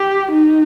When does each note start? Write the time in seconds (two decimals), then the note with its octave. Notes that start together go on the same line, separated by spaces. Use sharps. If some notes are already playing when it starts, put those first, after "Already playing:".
Already playing: G4
0.32 D#4